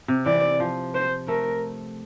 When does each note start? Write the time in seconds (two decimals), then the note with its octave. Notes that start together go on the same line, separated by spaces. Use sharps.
0.08 C3
0.25 E3 D5
0.60 F3
0.95 C5
1.28 A3 A#4